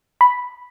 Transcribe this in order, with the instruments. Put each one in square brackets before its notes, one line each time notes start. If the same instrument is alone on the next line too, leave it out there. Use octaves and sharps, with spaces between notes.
[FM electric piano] B5